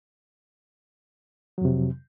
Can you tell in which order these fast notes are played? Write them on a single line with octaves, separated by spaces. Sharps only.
F#3 F2 C3